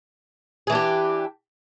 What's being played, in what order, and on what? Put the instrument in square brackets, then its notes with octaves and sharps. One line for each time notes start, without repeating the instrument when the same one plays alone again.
[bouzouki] G#4
E3
D4
G4